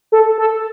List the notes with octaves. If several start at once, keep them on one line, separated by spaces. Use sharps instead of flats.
A4
A4